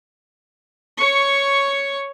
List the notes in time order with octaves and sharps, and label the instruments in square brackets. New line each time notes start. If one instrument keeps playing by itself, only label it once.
[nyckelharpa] C#5 C#6